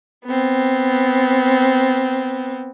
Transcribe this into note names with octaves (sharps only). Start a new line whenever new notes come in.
B3 C4